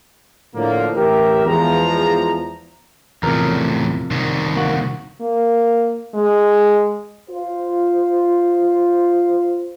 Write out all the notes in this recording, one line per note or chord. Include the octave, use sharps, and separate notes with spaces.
A2 D3 F3 A#3
A1 G4 A#4 E5
E2 F3 G#3 A#5
E2 A2 C3 F3 A#4
C2 D#3
A#3 F#4
A#3
G#3
F4 C5